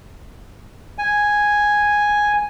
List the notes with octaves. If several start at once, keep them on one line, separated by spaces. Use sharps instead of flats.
G#5